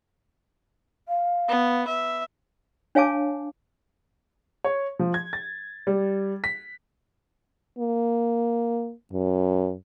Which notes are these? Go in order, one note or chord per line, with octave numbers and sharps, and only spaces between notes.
F5
B3
E5
D4 C#5 F5 G#5 A5 D6
C#5
F3
G#6
A6
G3
B6
A#3
F#2